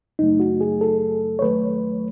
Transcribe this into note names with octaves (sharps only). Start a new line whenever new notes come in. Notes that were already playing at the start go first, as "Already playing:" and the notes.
F#2 C#3 F#3 A3 D#4
F#4
G#4
A4
C#5
D#2 D#3 F#3 A3 B4